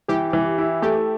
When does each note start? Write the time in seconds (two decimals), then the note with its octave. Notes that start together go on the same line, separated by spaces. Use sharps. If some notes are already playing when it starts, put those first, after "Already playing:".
0.08 E3 G4
0.33 E3
0.58 E4
0.82 A3 G4